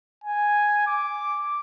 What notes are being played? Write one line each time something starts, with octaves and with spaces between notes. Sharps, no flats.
G#5
D6